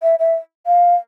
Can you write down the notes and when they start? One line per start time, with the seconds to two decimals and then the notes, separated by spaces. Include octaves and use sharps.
0.03 E5
0.19 E5
0.67 F5